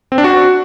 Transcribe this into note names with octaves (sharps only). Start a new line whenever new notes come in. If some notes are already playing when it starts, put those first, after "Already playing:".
C4
D4
F#4